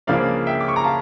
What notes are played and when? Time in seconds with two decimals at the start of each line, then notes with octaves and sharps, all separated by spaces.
0.07 C#2 C#3 F3 A#3 D4 D5 F5
0.47 E5 G5
0.61 D6
0.68 C#6
0.76 A#5
0.84 F5 A5